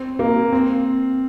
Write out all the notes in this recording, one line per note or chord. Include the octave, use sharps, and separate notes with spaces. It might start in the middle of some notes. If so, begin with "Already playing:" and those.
Already playing: C4
A#3
C4